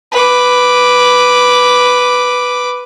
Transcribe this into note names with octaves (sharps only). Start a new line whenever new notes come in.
B4 D6